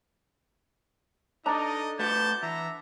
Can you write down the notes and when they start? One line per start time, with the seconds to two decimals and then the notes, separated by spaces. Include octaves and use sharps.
1.46 D4 D#4 A4 D#5 A#5
1.99 A3 F#4 B4 F#5 A5 G6
2.43 E3 E5 A#5